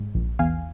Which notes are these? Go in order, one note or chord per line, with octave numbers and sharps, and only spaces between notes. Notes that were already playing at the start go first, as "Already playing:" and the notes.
Already playing: G#2
A#1
E2 F5 G#5